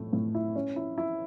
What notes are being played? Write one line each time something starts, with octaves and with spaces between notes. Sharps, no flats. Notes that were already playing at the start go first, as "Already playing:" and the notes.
Already playing: A2 A3
A2
E4
C#4
E4
E4